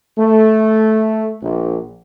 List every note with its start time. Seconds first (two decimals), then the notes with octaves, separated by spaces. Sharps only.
0.18 A3
1.42 A#1